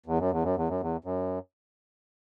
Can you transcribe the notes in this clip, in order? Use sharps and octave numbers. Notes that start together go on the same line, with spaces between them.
E2
F#2
E2
F#2
E2
F#2
E2
F#2